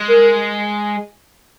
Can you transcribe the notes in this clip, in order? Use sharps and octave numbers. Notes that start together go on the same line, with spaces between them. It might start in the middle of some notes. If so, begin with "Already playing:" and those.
Already playing: G#3
A#4